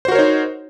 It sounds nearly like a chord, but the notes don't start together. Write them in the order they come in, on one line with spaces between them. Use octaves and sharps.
C5 F#4 A#4 C#5 D#4